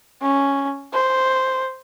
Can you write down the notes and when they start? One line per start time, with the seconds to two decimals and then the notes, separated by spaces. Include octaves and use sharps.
0.22 C#4
0.93 C5